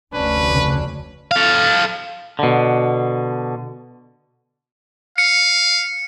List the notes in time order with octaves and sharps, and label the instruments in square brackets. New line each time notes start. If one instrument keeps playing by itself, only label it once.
[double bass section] F1 D2 [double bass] C#4 D4 [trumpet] B4
[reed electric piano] C#3
[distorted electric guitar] A4 F5
[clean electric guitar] B2 D3
[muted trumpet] F5 [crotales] C#7